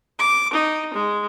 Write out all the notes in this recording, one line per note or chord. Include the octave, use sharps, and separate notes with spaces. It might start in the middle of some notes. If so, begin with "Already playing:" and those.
D6
D#4
G#3